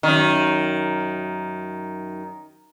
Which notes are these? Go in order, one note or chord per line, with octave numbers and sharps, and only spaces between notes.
F#2 D#3